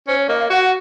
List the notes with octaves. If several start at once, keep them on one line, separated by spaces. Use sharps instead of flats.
C#4 C5
C#5
A#3 D#5
F5
F#4 F#5